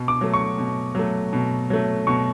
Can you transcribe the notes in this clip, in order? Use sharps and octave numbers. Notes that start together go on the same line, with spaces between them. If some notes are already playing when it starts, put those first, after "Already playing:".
Already playing: B2
D6
F#3 A3
C#6
B2
F#3 A3
B2
F#3 A3
B2 C#6